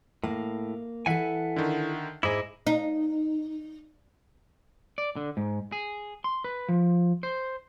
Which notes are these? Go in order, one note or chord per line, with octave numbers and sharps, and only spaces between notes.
A2 A#3
E3 A4 E5 F#5 G#5
D3 D#3
G#2 E4 G#4 D#5 D6
D#4
D5
D3
G#2
G#4
C6
B4
F3
C5